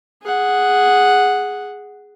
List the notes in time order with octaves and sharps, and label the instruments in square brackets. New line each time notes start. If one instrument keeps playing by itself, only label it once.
[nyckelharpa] G#4 F#5